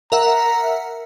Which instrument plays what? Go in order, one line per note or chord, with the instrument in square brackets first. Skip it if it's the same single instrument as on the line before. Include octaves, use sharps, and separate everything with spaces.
[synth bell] A#4 E5 F#5 [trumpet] A#5